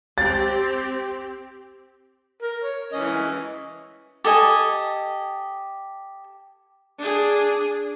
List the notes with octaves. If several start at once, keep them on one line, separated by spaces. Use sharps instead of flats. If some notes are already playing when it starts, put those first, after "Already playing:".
C4 G4 A6
A#4
C#5
E3 C#4 D#5
G4 A4 D#5 G#5
D4 G#4